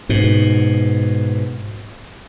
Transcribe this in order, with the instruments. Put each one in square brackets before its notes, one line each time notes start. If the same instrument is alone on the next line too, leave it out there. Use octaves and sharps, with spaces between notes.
[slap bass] G#2 B2